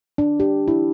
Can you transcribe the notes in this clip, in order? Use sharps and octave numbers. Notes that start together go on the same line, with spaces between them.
D4
G4
E4